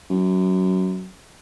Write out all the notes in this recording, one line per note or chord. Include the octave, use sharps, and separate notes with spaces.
F#2